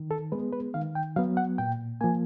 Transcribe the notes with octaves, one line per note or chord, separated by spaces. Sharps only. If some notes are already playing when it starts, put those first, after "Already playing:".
Already playing: D#3
A4
G#3 B3 B4
B4
D#3 F5
G5
F#3 B3 F5
F#5
A#2 G5
F3 A#3 G#5